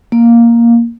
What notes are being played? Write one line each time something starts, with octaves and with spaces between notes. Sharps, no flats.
A#3